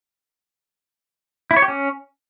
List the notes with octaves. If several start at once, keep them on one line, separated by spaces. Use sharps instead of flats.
E4
C#5
G4
C#4